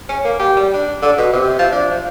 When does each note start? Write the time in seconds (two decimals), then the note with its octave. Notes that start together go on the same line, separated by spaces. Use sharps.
0.09 C#4
0.25 A#3
0.39 G4
0.56 G3
0.74 D4
1.02 D3
1.18 B2
1.33 C3
1.59 F3
1.72 D4
1.90 F3